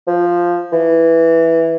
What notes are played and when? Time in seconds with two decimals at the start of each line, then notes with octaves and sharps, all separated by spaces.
0.07 F3
0.73 E3